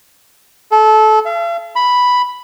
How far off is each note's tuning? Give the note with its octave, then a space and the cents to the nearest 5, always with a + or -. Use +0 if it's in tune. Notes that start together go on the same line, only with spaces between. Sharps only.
A4 -25
F5 -45
B5 +0